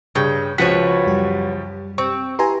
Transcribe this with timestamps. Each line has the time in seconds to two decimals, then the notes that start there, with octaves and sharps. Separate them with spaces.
0.15 G2 C#3 G5
0.58 C#2 F3 F#4 B4 C#5 B6
1.06 F#2 G3 G4
1.98 C4 C#6
2.39 E4 G4 B4 G#5 A#5 C6